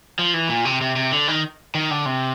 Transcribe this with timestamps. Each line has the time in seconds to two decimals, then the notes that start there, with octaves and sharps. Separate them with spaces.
0.19 F3
0.34 E3
0.49 A#2
0.65 C3
0.81 C3
0.96 C3
1.12 D3
1.28 D#3
1.75 D#3
1.91 D3
2.06 C3